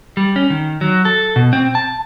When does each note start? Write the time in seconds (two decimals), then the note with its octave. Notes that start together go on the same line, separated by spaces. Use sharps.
0.17 G3
0.36 C#4
0.50 D#3
0.81 F#3
1.05 A4
1.36 B2
1.53 C4
1.75 A5